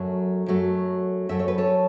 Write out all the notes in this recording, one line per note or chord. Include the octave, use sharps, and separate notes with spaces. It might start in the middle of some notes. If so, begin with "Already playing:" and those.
Already playing: F#2 F#3 A3
F#2 F#3 A3
F#2 F#3 A3 E5
C#5
B4
A4 C#5